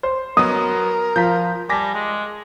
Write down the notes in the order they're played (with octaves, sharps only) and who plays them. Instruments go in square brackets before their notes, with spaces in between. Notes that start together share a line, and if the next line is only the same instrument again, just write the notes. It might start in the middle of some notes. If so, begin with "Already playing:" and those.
[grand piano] C5
[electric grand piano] F#3 B3 [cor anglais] A#4 [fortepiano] D#6
[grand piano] F3 F4 A#5 [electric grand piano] G6 B6
[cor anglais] G3 [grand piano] G#5 A5 [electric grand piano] D6 A#6 B6
[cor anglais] G#3